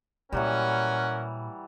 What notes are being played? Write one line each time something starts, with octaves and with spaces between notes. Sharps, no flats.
A#2 E3 F#3 G3 C#4 A#4 F#5